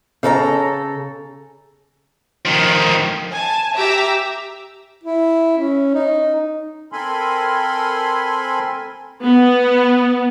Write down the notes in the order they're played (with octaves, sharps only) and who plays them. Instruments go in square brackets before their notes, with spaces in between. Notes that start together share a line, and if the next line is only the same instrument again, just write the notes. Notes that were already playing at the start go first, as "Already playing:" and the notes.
[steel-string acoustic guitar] C#3 A4 D5 A#5
[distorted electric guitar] D#3 F3
[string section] G#5 A5
G4 E5 A#5 D6 E6
[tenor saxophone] E4
C#4
D#4
[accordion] C4 A4 A#4 G#5 B5 C6
[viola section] B3